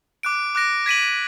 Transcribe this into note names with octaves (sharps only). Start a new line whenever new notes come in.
D6 F#6 D7
D6 F#6 A#6 D7
G#6 B6 D#7 F#7